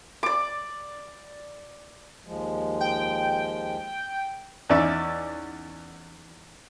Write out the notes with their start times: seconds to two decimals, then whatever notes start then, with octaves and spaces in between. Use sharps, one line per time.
0.23 D5 D6
2.27 D#2 F3 G#3
2.81 G5
4.69 E2 C#4 D#4 D5 E5 D6